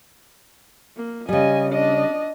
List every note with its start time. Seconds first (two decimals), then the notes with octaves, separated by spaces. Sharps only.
0.96 A#3
1.29 C#3 G3 D#5 G#5
1.71 D4 D#5